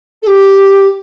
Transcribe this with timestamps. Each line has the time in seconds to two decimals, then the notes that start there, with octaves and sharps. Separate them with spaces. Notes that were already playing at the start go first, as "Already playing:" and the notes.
0.22 A4
0.26 G4